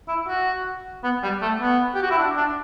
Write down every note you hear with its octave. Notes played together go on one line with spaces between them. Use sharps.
E4
F#4
B3
G3
A3
B3
G4
F#4
E4
D4
D4